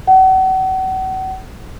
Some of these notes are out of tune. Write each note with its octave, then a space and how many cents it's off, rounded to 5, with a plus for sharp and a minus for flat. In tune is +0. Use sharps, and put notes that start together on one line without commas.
F#5 +35